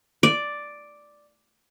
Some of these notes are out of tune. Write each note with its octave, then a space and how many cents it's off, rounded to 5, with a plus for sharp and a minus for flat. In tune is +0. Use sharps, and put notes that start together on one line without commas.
D5 +0